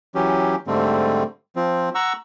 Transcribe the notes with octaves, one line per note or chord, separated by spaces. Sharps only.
E3 F#3 C#4 G4
G#2 D3 G3 A3 C4
F3 C4
F#5 A#5 C#6 E6